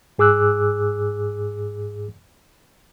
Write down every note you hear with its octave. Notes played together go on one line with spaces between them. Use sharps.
G#2 G#4 D6 E6 F#6